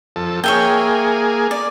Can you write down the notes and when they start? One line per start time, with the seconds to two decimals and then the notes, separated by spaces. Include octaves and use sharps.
0.16 F2 A4
0.44 A#3 G#4 C#5 E5 G5
1.51 D5